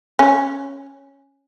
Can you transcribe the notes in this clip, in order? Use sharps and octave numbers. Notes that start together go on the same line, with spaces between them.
C#4